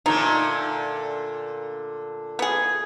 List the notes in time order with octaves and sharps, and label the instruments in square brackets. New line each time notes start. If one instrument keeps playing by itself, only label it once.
[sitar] A#2 D3 A3 [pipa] D#4
[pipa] B3 G#4